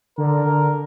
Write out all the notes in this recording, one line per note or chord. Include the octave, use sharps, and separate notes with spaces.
D3 A#4
D3